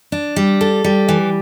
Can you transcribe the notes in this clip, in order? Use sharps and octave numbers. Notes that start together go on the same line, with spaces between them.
D4
G3
A4
G3
E3